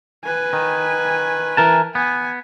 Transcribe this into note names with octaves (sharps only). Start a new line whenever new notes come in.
B4 G#5
D#3
E3 A#4 A5
B3 G#5